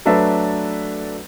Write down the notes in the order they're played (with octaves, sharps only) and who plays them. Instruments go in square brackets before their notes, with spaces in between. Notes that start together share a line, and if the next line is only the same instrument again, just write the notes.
[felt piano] F#3 A3 D4 A4 B4 E5